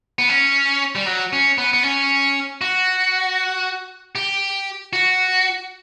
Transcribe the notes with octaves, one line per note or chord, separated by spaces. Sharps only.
B3
C#4
G3
F#3
C#4
B3
B3
C#4
F#4
G4
F#4